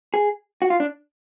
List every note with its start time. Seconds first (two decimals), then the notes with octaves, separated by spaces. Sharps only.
0.14 G#4
0.62 F#4
0.70 F4
0.80 D4